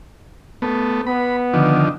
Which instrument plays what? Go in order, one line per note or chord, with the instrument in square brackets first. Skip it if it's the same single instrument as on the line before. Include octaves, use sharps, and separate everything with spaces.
[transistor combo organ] A3 B3
[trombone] B3 [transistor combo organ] B5
[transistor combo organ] D3 D#3 F3